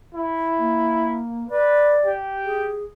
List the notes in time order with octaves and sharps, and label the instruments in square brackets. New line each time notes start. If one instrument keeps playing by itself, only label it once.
[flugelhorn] E4
[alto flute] A#3
[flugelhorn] B4 [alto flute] D5
[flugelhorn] G4
[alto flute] G#4